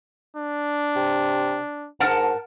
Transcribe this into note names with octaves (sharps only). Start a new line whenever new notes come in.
D4
C3
G#2 A#4 F#5 A5